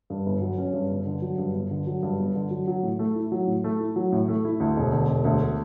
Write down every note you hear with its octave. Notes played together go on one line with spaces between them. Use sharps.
G2
G1
F#3
C#4
G2
G1
D3
F#3
G2
G1
D3
F#3
G2
G1
D3
F#3
F#3
A2
A3
E4
F#3
A2
A3
E4
F#3
A2
A3
E4
D2
E1
D3
E1
D2